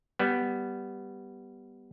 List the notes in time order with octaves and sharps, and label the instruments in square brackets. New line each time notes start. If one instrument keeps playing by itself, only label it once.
[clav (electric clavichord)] G3 B3